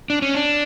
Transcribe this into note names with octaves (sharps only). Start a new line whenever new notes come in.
D4
C#4
D4